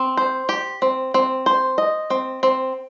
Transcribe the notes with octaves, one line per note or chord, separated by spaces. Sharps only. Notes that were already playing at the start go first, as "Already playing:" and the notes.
Already playing: C4
C5
G4
C4
C4
C5
D#5
C4
C4